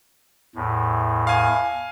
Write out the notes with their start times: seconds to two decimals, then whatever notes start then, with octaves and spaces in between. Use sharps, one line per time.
0.55 E2 A2
1.27 F5 G#5